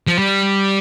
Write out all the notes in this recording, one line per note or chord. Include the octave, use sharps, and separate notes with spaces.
F3
G3